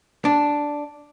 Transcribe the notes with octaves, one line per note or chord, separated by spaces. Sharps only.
D4